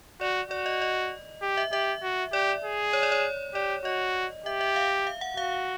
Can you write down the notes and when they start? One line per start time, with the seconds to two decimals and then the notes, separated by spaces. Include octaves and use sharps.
0.20 F#4 D5
0.50 F#4 D5
0.66 D#5
0.82 D#5
1.42 G4
1.57 E5
1.72 G4 E5
2.03 F#4
2.33 G4 D5
2.63 G#4
2.93 C#5
3.03 D5
3.12 C#5
3.54 G4 D5
3.85 F#4 D#5
4.46 G4 E5
4.61 E5
4.76 F5
5.07 F5
5.21 F#5
5.37 F#4 F5